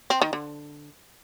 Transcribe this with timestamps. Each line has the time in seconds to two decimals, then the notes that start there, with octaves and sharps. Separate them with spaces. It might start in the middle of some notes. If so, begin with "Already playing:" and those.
0.10 C4
0.22 D#3
0.33 D3